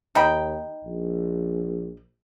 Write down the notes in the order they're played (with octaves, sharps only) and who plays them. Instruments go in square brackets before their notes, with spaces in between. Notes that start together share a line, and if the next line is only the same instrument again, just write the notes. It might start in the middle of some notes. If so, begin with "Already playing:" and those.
[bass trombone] D#2 [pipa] D#4 G5 B5
[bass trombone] A#1